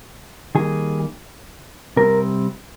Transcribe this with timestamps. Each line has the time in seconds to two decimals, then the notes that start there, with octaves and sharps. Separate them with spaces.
0.55 D#3 G3 A#3 G#4
1.96 C3 G3 C4 A#4